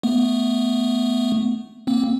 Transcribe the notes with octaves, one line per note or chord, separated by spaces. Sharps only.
A3 B3
A#3 C4